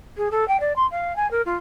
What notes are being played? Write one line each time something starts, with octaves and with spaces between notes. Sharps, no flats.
G#4
A4
G5
D5
C6
F5
G#5
A#4
F4